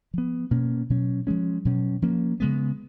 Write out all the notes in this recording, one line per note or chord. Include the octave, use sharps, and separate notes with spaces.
F3 B3
B2 A#3 C#4
B2 F#3 C#4
F3 G#3 C#4
B2 F#3 C#4
F3 A#3 C#4
C#3 G#3 B3